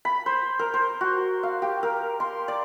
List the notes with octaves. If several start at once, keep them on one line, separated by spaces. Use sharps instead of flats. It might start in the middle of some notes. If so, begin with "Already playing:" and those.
B5
C5
A#4
C5
F#4
F5
G4
A#4
C6
D5